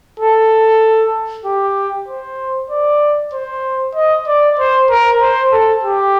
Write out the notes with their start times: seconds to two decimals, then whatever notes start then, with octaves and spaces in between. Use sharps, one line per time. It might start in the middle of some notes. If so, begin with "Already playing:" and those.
0.20 A4
1.45 G4
2.08 C5
2.70 D5
3.33 C5
3.95 D#5
4.27 D5
4.59 C5
4.90 A#4
5.21 C5
5.52 A4
5.84 G4